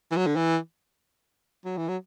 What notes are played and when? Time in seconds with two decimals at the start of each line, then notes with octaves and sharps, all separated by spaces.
0.11 E3
0.16 F#3
0.27 D3
0.36 E3
1.65 F#3
1.77 E3
1.88 F#3